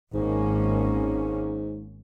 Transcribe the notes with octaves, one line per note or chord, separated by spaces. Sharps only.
G#1 G#2 A#3 C#4